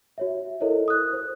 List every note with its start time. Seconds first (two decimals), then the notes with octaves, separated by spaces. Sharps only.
0.18 F#4 C#5 E5
0.60 E4 A4 A#4 C5 C#5 D#5
0.88 D#6 F#6
1.13 C5